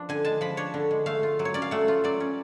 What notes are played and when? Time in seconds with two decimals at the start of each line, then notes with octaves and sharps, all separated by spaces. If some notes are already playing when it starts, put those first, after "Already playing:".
Already playing: F3 D4
0.09 D3 G#5
0.25 G#3 A5
0.41 F3 B5
0.57 D4 C#5
0.74 D3
0.91 G#3
1.06 A3 F5
1.23 F4
1.39 F#3
1.45 C#5
1.54 C#4 D5
1.62 F5
1.71 A3 F#5
1.88 F4
2.04 F#3 D5
2.20 C#4